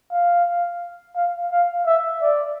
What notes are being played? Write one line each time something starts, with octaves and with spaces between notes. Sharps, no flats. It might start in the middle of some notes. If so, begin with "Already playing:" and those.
F5
F5
F5
E5
D5